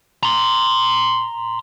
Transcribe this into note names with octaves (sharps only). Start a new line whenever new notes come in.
A#5 C6